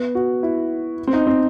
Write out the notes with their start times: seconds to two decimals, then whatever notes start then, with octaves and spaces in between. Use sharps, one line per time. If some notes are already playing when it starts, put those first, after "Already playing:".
Already playing: B3
0.15 F#4
0.43 E4
1.07 C4
1.13 D#4
1.27 C4